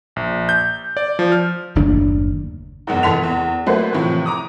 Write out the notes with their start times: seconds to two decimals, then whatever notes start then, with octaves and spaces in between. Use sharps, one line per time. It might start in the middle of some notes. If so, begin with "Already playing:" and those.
0.16 A#1
0.49 G6
0.97 D5
1.19 F3
1.32 F6
1.75 F#1 D#2 A2 D4
2.87 F#1 E2 G#2
3.03 F1 E3 A4 C6 B6 F7
3.23 E2
3.66 F#3 A3 A#3 B4 C5
3.93 A2 C3 E3 F3
4.26 A#5 D6 D#6